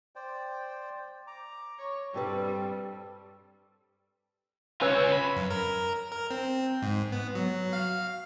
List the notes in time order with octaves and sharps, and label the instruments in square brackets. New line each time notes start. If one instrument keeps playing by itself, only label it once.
[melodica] C5 D5 G5
A#5 D6
[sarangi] C#5
[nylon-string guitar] G2 G4 B4 [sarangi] G3 [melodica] C4 A4
[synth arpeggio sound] C#4 B4 E6 [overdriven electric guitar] F4 C#5
[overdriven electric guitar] B5
[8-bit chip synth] F#2
A#4
A#4
C4
G#2
B3
F#3
F5